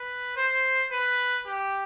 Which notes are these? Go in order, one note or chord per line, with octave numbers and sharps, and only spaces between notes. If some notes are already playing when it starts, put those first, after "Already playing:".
Already playing: B4
C5
B4
G4